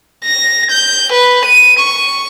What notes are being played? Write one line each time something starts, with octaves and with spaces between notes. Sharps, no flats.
A#6
G6
B4
D#7
C#6